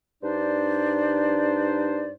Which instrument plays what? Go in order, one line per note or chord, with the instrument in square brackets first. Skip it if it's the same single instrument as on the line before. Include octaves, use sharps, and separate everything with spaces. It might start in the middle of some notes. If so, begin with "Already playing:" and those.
[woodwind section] G2 D4 D#4 C5 D5